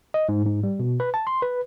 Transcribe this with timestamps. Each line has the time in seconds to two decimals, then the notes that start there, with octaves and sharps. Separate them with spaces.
0.14 D#5
0.29 G#2
0.46 G#2
0.63 G3
0.80 B2
1.00 B4
1.14 A5
1.27 C6
1.42 B4